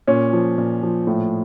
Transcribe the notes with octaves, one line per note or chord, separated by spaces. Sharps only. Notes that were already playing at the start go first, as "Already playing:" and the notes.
A#2 C#4
F3
A#2
F3
A2